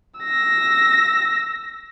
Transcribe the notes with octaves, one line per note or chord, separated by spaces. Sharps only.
E6 A#6